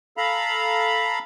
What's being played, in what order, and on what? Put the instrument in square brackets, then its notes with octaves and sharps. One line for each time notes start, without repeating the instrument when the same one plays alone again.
[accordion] A4 F5 A#5 B5